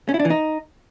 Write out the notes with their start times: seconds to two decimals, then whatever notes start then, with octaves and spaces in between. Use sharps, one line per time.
0.09 C#4
0.14 E4
0.19 D4
0.25 E3
0.30 D#4